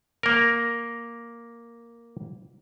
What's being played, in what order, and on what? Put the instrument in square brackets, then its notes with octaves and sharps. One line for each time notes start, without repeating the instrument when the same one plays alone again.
[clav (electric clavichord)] A#3 A#4